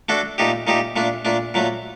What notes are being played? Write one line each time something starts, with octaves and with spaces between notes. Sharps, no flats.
A3 D4 F#4 A4
A#2 A3 D#4 G4
A#2 A3 D#4 G4
A#2 A3 D4
A#2 A3 D4
A#2 F#3 A3